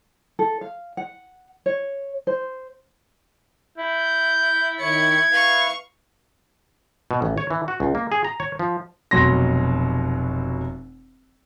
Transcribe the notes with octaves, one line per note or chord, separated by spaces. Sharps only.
A4
F5
F#5
C#5
C5
E4 G6
D#3 C#5 G#6 C#7
E4 B4 F5 C#6
B2
A1
C#5
E3
F#4
C#2
A#3
G#4
A#5
C#5
F3
F1 B2 F#3 C6 A#6